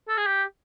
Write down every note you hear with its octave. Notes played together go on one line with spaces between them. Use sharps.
A4
G#4
G4